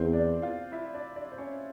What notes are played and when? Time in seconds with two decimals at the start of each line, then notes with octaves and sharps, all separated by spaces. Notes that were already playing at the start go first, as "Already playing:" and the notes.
Already playing: E2 C4 C5
0.13 D4 D5
0.42 F4 F5
0.72 E4 E5
0.94 D4 D5
1.16 D4 D5
1.32 C5
1.38 C#4 C#5